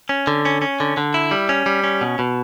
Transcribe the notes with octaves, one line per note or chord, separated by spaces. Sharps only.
C#4
D3
C#4
C#4
D3
D3
E4
G3
C#4
G3
C#4
B2
B2